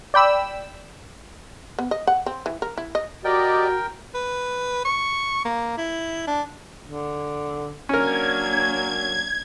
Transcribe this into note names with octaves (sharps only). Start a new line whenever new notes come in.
D5 G5 B5 E6
B3
D#5
F#5
C4
E3
A#4
E4
D#5
F#4 G4 A#4 D5 D#5 G5
B4
C#6
A#3
E4
D4
D3
F#3 A#3 C#4 D4 A#4 G#6